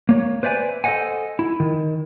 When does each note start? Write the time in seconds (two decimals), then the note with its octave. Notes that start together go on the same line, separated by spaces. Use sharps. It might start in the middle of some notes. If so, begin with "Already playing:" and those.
0.09 A#3 C#5
0.43 B4 C5 D5 E5 G#5
0.84 A4 C5 C#5 D#5 F#5 G#5
1.39 E4
1.60 D#3